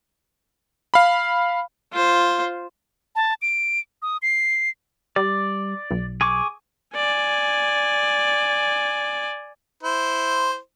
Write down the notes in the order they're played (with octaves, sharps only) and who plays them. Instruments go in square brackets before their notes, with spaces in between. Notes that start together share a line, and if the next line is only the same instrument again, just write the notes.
[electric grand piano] F5 B5
[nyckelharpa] F4 C5
[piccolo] A5
D7
D#6
C7
[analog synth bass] G3 [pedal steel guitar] D5
[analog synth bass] B1
[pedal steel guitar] G#4 C#6 D6
[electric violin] D5 G#5
[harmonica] E4 C5